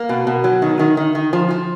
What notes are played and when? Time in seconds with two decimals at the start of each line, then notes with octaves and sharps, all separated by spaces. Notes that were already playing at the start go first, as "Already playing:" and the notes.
Already playing: A#3
0.09 B2
0.27 B2
0.44 F#3
0.62 D#3
0.79 D#3
0.97 D#3
1.15 D#3
1.33 F3
1.51 F3